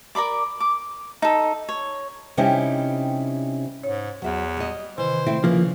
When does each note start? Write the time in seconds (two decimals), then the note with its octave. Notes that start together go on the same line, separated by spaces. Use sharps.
0.15 A#4 D5 B5 D6
0.60 D6
1.22 D#4 A4
1.69 C#5
2.37 C3 G3 C#4 D#4 E4 G4
3.84 G#2 C#5
4.22 E2 F#3 E5
4.57 G3 D#5
4.98 C3 D#3 E3 C5
5.26 A3 C4 E4
5.44 C#3 E3 F3 A#3